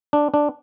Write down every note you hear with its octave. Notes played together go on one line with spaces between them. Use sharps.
D4
D4